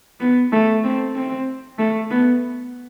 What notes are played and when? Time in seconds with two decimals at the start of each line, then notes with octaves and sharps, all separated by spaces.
0.20 B3
0.53 A3
0.84 C4
1.16 C4
1.79 A3
2.11 B3